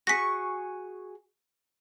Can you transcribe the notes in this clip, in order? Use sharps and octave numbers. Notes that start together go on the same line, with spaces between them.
F#4 G#4 C#6 A#6 B6